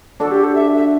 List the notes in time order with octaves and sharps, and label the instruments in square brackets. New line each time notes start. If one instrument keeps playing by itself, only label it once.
[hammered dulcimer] D4 F#4 [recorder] A4
[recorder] G4
A4
E5
E5